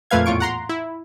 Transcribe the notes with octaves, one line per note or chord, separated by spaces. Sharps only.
F2 A#2 A3 B4 F5 G#6
E2 A2 F4 C#6 D7
F#5 A#5 C6
E4